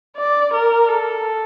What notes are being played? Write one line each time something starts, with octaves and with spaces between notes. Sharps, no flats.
D5
A#4
A4